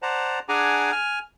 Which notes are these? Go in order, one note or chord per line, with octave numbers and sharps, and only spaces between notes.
C5 D5 F#5 A5 A#5
D4 G#4 F#5 G#5 A#5 D6
G#5 F6